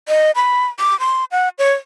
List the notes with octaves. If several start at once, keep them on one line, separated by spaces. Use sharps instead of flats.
D#5
B5
D6
C6
F#5
C#5